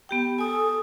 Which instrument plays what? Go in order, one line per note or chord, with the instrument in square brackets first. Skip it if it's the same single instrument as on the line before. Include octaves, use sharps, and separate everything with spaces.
[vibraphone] B3 G4 G5
[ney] A4 [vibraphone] G#5 D#6